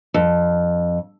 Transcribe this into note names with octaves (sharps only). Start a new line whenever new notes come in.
F2